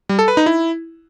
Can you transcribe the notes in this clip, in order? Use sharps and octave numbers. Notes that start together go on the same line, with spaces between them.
G3
A4
B4
D#4
E4